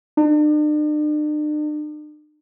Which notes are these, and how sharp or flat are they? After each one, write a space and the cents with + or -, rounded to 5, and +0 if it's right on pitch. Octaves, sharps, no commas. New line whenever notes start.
D4 +45